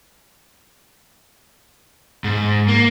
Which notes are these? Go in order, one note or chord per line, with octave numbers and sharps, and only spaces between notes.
G#2
A#3